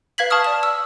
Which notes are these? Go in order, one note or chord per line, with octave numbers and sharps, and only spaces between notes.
B4 F5 G#6 B6 F#7
F5 A5 C#6 D#6 F6
D5 E7
E6